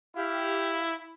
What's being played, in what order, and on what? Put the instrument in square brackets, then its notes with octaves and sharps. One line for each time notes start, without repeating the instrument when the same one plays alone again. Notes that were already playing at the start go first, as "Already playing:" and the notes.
[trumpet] E4 [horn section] G4 F5